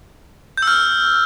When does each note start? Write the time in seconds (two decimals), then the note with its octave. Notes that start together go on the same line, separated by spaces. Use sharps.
0.57 G6
0.62 E6
0.67 F6